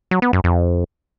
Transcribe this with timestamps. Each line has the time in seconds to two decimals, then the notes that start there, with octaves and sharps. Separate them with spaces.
0.11 F#3
0.22 B3
0.33 F#2
0.44 F2